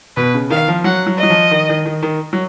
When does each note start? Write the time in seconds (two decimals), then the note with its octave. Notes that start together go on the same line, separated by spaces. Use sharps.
0.17 B2 B4
0.34 C#3
0.50 D#3 F5
0.68 F3
0.84 F#3 F#5
1.07 F#3
1.18 D#5
1.23 F#3
1.30 F3
1.51 D#3
1.69 D#3
1.86 D#3
2.03 D#3
2.33 F#3